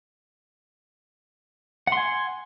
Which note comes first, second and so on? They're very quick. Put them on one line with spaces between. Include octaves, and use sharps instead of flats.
F#5 C6 G#5